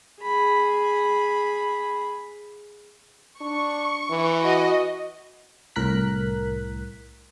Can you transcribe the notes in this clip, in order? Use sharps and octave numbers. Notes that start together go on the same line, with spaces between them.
G#4 B5
D4 C#6
E3
F#4 D#5
C2 A2 A#4 F#6 B6